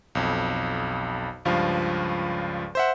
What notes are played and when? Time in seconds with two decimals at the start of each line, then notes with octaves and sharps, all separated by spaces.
0.15 B1 F2
1.45 C#2 G2 F3 F5
2.75 C5 E5 F#5